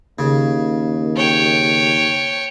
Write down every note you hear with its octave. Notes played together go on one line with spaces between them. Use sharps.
D#2 C#3
C#5 G5